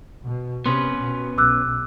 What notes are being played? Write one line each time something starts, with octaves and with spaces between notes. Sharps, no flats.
B2
C3 B3 C#4 B4 C6
B2
B1 D6 E6 F#6